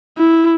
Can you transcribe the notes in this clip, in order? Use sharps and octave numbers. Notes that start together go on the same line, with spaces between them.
E4